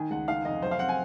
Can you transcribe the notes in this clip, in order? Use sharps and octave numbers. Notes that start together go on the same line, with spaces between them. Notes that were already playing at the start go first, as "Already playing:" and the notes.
Already playing: D#3 G#5
C#2 F#5
D#3 F5
F1 D#5
F#3 C5
F5
C4 F#5
G#5